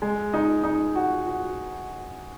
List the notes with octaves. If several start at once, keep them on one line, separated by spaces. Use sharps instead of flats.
G#3
D#4
D#4
F#4
F#4